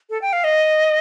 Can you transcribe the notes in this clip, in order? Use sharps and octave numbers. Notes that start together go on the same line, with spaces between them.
A4
G5
F5
D#5